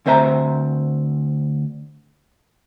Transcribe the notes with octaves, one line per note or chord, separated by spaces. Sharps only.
D2 C4 C5 E5 A#5